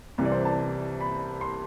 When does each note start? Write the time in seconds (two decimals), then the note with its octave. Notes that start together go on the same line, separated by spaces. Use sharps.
0.18 C2 C3 E3
0.25 D5
0.32 C5
0.45 A5
1.01 B5
1.41 C6